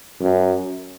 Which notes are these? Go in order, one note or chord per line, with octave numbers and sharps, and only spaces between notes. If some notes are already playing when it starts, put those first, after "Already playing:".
F#2